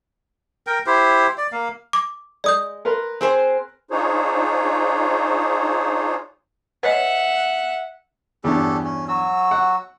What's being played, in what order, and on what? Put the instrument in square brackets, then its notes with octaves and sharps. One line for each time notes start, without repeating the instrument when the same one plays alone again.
[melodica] A#4 G5
E4 G4 C5
D5
A#3 F5
[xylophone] D6
[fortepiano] G#3 [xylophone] D5 D#6 G6
[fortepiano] A#4 B4 C6
[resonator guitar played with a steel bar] C4 G#4 C5
[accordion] D4 D#4 F4 G#4 C5 C#5
[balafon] B4 C#5 D#5 [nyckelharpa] E5 F#5
[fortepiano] E2 G2 [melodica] C#4 G4 A4
[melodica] C#4
F#3 F#4 E6
[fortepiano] F#5